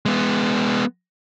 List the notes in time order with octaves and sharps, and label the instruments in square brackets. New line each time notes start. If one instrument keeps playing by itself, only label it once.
[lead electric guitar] G#3 B3